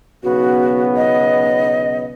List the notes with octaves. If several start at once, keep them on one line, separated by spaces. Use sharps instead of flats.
B1 C#3 B3 F#4
D#5